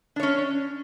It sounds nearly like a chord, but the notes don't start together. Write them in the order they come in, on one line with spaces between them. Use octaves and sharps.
D4 C#5 C#4